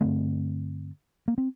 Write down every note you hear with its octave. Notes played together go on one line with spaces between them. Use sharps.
G2 D3 A3 C4
A#3
C4